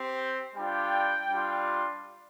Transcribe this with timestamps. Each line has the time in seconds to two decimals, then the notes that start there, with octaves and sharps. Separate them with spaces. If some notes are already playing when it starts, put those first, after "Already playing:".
Already playing: C4 G4
0.55 G3 D4 F4 G5
1.29 G3 D4 F4